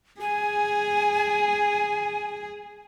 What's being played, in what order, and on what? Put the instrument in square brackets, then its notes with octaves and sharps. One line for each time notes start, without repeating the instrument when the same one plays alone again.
[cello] G#4 [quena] G#5